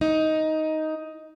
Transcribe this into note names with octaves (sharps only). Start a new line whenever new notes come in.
D#4